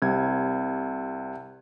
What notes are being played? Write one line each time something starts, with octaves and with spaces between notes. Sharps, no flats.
C2 C3 G#6